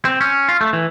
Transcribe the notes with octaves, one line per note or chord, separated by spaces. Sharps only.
C4
C#4
F4
A3
E3